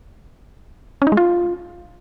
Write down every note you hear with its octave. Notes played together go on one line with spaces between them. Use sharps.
C#4
D#4
G#3
F4